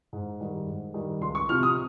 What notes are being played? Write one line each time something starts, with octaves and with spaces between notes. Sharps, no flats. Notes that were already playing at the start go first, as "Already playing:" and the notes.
G#2
D#3 G3
G#2
D#3 G3
C#2 C6
C#6
C3 F3 F6
D#6